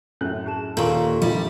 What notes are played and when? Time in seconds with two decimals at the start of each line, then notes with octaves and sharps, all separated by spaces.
0.21 F#2 A2 F#6
0.46 G#4 A5 E7
0.77 D#2 A#2 A4 F5 A#5 C#6
1.22 F1 A#1 D#3 G3